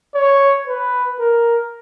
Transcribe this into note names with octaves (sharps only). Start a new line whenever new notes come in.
C#5
B4
A#4